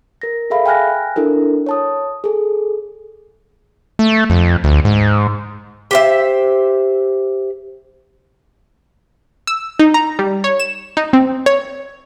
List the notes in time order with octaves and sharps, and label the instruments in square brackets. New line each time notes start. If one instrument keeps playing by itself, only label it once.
[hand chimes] A#4 A#6
G#4 A4 E5 F5 B5
G5 G#5 F6 F#6 A#6
D4 E4 A4 A#4
C#5 A5 D#6
G#4 A4
[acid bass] A3
F2
D2
G#2
[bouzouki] G4 C5 E5
[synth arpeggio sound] E6
D#4
A#5
G3
C#5
E7
D#4
C4
C#5